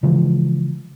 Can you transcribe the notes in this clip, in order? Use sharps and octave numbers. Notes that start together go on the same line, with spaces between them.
C#3 E3 F3 G#3